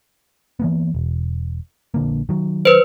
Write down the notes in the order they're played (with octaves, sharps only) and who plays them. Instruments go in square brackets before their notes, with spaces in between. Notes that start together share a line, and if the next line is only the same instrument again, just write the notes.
[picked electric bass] E3 A#3 B3
E1
A#1 D3 A#3
D#3 F#3
[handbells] B4 C5